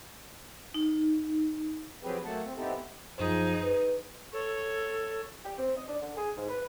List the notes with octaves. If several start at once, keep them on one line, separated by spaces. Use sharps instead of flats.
D#4
F3 F#3 C4 G4 G#4 B4
F#3 A3 A#3 F#5 A5
C4
B3 C4 D#4 E4 G4 A4
F#2 F3 D#4 G#4 C5
B4
A4 C#5
G4
C4
D#5
D4
D3
G#4
G#2
B4